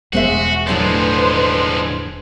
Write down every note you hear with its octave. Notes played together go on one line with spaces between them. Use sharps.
E1 G#3 B3 F#4 C5 E5
A2 D3 F3 F#3 G#3 B4 C5